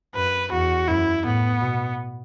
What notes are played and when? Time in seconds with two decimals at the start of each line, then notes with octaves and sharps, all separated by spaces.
0.15 F#2 B4
0.52 E2 F#4
0.88 F#2 E4
1.25 A2 B3
1.61 B2